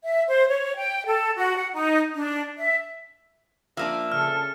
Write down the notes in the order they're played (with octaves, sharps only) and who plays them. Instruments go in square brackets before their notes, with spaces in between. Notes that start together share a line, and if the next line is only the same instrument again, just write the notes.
[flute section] E5
C5
C#5
G5
A4
F#4
F#5
D#4
D4
E5
[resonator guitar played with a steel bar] F3 A#3 D4 [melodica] E5
[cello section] C#3 A4 [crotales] F6